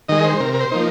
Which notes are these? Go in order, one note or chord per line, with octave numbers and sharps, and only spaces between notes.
D#3 G#3 D#5
C5
C3 A#4
A#4
C5
F3 A#3 D#4